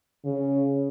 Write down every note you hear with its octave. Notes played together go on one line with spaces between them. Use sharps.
C#3